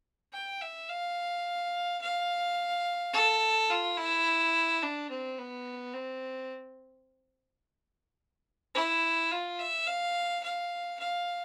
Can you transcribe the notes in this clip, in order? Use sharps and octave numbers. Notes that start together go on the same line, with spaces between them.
G5
E5
F5
F5
A4
F4
E4
D4
C4
B3
C4
E4
F4
E5
F5
F5
F5